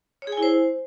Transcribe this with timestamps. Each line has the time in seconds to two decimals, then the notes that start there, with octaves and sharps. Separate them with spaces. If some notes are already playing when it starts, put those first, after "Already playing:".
0.22 C#5
0.27 G#4
0.32 G#5
0.37 E4
0.43 C5